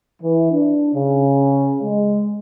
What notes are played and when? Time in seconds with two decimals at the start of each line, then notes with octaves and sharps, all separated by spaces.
0.22 E3
0.51 D4
0.94 C#3
1.81 G#3